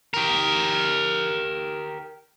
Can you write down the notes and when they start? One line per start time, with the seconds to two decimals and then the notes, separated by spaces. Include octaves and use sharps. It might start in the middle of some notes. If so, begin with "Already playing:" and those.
0.14 G4 A#4